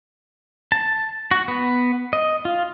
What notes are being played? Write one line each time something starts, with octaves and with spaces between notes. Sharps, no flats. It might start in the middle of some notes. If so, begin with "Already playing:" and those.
A5
F#4
B3
D#5
F4